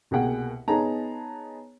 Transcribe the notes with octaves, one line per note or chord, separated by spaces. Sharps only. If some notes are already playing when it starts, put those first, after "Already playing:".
C2 B2 A#3 G#4 F#5 G5
B3 D#4 G#4 C#5 A5 A#5